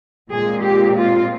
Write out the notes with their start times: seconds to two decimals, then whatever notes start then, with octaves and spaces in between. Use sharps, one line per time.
0.30 A#2 G#3 C4 G#4
0.63 G4
0.96 F4